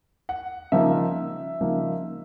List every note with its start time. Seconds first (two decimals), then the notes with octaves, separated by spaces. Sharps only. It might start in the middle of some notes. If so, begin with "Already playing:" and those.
0.29 F#5
0.72 C#3 F3 A#3 D#4 E5
1.61 C#3 F3 A#3 D#4